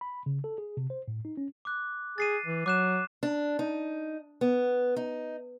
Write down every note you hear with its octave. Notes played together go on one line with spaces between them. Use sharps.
B5
C#3
A4
G#4
C3
C5
A2
D#4
C#4
D6 F#6
G#4 A6 C7 D#7
E3
F#3 D6 F#6 E7
D4
D#4
B3
D#4